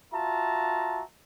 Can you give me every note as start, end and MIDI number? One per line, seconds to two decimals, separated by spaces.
0.14 1.03 65
0.14 1.03 66
0.14 1.03 76
0.14 1.03 81
0.14 1.03 82